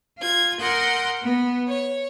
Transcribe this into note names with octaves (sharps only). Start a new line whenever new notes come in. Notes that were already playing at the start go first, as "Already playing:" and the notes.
F4 G#6
A#4 F#5 C6 D#6 G6
B3
C#5